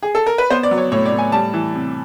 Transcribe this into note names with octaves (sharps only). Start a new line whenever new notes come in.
G#4
A4
A#4
B4
B3 C5
D5
F#3
C#5
A2 C#5
D5
A2
G#5
G3 A5
E3
C3